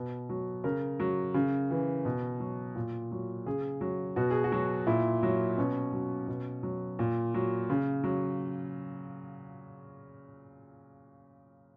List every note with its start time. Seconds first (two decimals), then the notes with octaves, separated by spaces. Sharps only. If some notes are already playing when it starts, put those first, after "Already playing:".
Already playing: B2
0.29 F#3
0.64 C#3 A#4
1.00 F#3
1.34 C#3
1.71 E3
2.05 B2
2.40 F#3
2.75 A#2
3.12 F#3
3.46 C#3 G#4
3.81 F#3
4.16 B2 F#4
4.30 G#4
4.44 F#4
4.52 F#3
4.87 A#2 E4
5.23 F#3
5.58 B2 C#4
5.93 F#3
6.28 B2
6.63 F#3
6.99 A#2
7.34 F#3
7.70 C#3
8.04 F#3